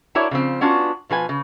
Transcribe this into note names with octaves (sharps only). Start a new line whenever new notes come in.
D4 E4 F#4 A#4 C#5 D5
C#3 F3 C4
B3 C#4 D4 F4 F#4
B2 F3 B4 G#5
C#3